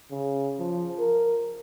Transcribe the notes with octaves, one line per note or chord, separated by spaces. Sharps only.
C#3
F3
A#4